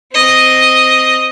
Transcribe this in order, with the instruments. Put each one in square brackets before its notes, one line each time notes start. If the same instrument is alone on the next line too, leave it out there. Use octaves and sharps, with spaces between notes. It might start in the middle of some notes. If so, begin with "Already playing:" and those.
[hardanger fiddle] C4 D#5